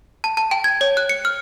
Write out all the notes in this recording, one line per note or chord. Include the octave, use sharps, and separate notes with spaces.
A5
A5
G5
G#6
C#5
F#6
C#7
F6